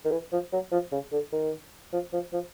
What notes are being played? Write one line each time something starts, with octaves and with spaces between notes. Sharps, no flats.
D#3
E3
F3
F#3
F3
C#3
D3
D#3
F3
F3
F3